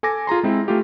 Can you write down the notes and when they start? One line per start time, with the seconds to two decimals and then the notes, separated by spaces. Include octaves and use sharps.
0.03 A4 G#5 D6 A#6
0.27 F4 G#4 A#5 C6
0.43 G#3 C4 E4
0.68 A3 F4 G4